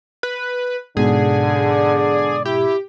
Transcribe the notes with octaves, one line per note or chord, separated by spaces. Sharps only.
B4
G#2 B2 D3 G#4
D5
E4 G4